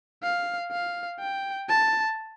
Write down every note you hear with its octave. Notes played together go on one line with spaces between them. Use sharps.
F5
F5
G5
A5